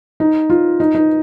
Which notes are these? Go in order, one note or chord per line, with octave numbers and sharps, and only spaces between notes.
D#4
F4
D#4
D#4